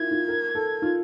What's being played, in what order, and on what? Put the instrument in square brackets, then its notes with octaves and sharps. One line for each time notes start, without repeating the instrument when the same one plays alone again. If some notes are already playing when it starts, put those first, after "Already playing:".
Already playing: [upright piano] E4 F4 A#4 [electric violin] G#6
[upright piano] F4
A#4
A4
F4